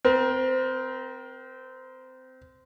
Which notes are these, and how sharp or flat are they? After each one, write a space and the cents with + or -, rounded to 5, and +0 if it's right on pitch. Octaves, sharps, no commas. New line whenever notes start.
C4 -20 A#4 +25